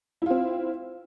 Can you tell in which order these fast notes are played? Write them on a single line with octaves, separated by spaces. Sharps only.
E4 F4 C4